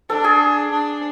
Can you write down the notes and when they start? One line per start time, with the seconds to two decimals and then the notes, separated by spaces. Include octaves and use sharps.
0.09 D4 A4
0.24 G#4
0.71 D4